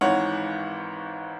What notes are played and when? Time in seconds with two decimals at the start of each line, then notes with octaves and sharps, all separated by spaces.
0.01 G#1 G#2 E3 C#5 F#5